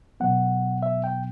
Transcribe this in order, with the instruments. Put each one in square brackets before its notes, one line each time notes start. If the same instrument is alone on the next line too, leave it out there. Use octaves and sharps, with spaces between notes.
[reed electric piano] B2 F#3 B3 F#5
E5
G5